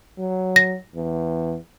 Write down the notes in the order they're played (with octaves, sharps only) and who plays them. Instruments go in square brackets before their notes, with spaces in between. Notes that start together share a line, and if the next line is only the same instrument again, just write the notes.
[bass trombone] F#3
[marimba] A#6
[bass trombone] E2